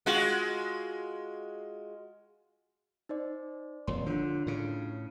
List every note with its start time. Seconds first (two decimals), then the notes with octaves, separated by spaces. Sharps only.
0.06 G#3 F4 F#4
3.09 D#4 C5 D5
3.87 D#1 F2 C#5 C6
4.06 D3 D4 F4
4.47 A2 C#3